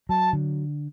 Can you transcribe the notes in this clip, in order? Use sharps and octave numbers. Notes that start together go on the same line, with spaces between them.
F#3 A5
D3